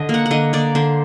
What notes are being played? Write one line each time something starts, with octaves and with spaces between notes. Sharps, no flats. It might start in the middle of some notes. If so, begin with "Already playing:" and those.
Already playing: D3 D#5
A#3
F#5
F#5
D3 D#5
A#3 D5
D3 C5